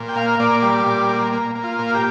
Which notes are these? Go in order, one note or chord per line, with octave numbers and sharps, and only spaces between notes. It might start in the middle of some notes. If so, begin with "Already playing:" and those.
Already playing: A#2
G5
A#3 F5
A#2 D5
G3
A#2
A#3
A#3
A#3
F4
A#2
G4